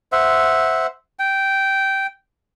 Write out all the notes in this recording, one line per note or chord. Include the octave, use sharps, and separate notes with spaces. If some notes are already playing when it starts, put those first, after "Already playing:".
C5 E5 F#5
G5